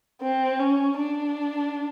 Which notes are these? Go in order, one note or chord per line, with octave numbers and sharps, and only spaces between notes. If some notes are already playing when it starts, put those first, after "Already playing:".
C4
C#4
D4